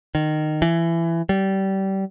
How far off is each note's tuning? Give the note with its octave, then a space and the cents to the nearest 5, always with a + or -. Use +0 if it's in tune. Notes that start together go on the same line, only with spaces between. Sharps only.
D#3 -20
E3 +20
G3 -25